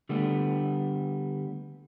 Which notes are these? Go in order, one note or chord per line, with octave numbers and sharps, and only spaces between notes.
D3 G3 A3 B3